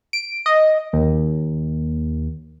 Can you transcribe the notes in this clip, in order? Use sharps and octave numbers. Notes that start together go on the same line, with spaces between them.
D7
D#5
D#2